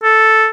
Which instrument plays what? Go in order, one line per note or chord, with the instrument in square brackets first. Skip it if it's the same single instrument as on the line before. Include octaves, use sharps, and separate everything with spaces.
[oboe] A4